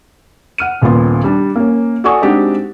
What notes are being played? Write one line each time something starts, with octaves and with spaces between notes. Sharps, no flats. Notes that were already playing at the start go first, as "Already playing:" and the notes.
F#5 F6 D#7
D#1 A#2 B3 F4 C6
G3 D4
A#3 C#4
F#4 A4 D5 G#5 C#6 D#6
G#3 C4 D4 D#4 F#4 G4